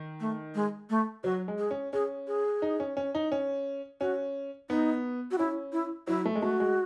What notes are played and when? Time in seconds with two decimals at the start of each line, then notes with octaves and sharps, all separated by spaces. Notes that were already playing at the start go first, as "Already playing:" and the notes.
Already playing: D#3
0.20 A3
0.55 G#3
0.90 A3
1.24 F#3 F#4
1.48 G#3
1.58 G#4
1.71 C#4
1.93 C#4 G#4
2.27 G#4
2.62 D#4
2.80 C#4
2.97 C#4
3.15 D#4
3.32 C#4
4.01 C#4 F#4
4.69 B3 D#4
5.31 F#4
5.38 C#4 E4
5.73 E4
6.07 F#3 E4
6.25 A3
6.35 G#3
6.42 A3 F#4
6.60 G#3